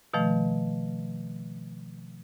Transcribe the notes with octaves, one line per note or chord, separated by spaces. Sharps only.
B2 D#3 F3 A3